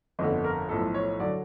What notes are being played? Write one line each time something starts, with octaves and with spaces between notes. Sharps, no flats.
G1 F2 D3 D#5
A#4
B1 A2 F3 A4
C#5
D3 F#3 D5